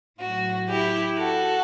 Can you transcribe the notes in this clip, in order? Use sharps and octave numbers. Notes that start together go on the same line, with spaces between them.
A2 F#3 F#4
E4 G4
F#4 A4